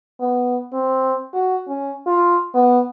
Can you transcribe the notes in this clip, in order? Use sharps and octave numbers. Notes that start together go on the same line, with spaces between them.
B3
C4
F#4
C#4
F4
B3